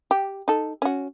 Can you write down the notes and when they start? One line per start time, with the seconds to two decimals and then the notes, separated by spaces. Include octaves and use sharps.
0.11 G4
0.48 D#4 A4
0.82 C#4 F#4